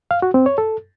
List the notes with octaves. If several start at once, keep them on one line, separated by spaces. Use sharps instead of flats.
F5
F#4
C4
C#5
A4